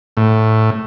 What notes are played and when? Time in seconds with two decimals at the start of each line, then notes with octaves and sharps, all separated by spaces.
0.17 A2